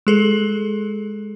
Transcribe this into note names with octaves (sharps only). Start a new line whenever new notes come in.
G#3 G#4 A4